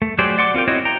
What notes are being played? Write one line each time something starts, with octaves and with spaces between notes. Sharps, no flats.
A3
F#3 G4 G#4 C5 D5
D5 F#5 C6 D6
C4 F4 A#4 G5
C4 E4 F#4 C#5 D#5
G5 A#5